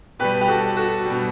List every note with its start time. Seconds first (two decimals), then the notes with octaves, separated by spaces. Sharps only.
0.19 B2 G3 G4 B4
0.41 G4
0.48 F#4 A4
0.77 F#4 A4
1.06 B2 G3